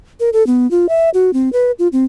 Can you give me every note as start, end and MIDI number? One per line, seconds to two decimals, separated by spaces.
0.20 0.30 70
0.33 0.45 69
0.47 0.69 59
0.71 0.89 65
0.89 1.10 76
1.14 1.33 66
1.33 1.52 60
1.53 1.71 71
1.79 1.88 65
1.93 2.04 60